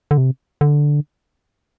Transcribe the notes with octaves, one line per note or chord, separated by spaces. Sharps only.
D3
C3
D3